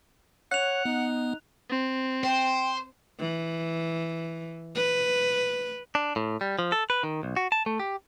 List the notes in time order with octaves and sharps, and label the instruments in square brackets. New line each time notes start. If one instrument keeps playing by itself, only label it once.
[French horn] C#5 [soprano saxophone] F#5 [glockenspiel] F#6 F7
[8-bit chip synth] B3 [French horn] D#4
[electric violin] C4
[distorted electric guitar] C5 [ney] G5
[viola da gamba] E3
B4
[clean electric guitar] D4
A2
G3
F3
A4
B4
D#3
B1
F#4
A5
A3
G4